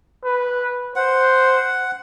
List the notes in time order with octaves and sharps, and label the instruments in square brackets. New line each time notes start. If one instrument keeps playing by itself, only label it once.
[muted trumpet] B4
[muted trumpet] C5 [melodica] F#5